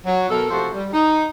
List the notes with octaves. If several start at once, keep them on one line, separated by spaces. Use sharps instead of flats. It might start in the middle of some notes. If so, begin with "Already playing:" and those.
F#3
B2 A4 A#4
C3 F3 A3 F#4 A4 C5
G3
D#4